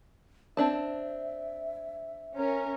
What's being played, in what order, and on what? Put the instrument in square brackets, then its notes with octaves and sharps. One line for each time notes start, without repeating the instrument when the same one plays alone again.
[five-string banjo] C4 D4 A5 [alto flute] E5
[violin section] C#4 A#4